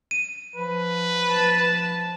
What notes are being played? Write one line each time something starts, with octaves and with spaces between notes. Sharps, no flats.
D#7
F3 B4
F3 A5